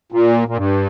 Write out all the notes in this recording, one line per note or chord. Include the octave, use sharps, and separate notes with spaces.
A#2
A#2
G2